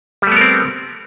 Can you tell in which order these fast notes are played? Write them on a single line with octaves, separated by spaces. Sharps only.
G3 A3 B3 A#4 C4